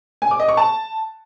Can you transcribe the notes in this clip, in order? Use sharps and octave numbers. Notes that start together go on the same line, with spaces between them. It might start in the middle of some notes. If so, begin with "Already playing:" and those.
G#5
D6
D#5
C#6
A5